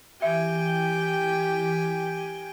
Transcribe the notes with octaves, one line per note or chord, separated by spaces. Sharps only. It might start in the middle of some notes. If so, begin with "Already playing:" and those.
E3 G4 E5 G5 G#5